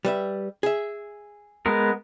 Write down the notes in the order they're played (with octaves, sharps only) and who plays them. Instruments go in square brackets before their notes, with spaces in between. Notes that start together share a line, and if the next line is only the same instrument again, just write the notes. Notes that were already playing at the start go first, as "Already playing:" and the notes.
[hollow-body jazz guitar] G3 B4 E5
G#4 E5
[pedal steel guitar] G#3 B3 A#4